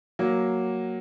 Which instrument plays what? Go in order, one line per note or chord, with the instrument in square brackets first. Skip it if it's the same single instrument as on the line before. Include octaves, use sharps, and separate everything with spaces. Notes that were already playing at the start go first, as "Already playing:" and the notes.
[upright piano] F#3 A#3